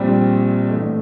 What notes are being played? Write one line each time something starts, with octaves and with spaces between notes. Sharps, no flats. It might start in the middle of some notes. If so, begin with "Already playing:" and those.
Already playing: A#1 A#2 G3 C4
A1 A2 A3 D4